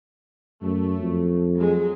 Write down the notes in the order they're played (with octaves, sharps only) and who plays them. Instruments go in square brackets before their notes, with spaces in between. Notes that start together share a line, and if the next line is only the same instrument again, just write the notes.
[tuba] F#2 [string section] A3
[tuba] F2
[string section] F#3 G#3